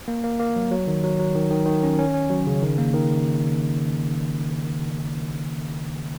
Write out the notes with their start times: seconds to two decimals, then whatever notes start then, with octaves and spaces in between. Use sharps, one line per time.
0.08 A#3
0.23 A#3
0.39 A#3
0.56 F#3
0.71 F#3
0.87 D#3
1.04 F#3
1.19 F#3
1.35 D#3
1.51 D#3
1.66 D#3
1.83 C#4
1.98 C#4
2.14 C#4
2.30 F#3
2.47 C#3
2.62 D#3
2.78 A#3
2.94 D#3